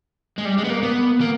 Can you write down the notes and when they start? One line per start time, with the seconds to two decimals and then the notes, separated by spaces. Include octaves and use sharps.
0.38 G#3
0.45 G3
0.58 G#3
0.64 B3
0.70 A#3
0.83 B3
1.21 A#3